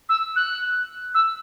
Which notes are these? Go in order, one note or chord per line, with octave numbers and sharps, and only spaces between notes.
E6
F#6
E6